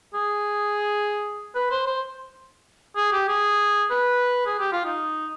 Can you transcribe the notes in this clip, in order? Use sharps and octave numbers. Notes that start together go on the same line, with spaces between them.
G#4
B4
C5
C5
G#4
G4
G#4
B4
G#4
G4
F4
D#4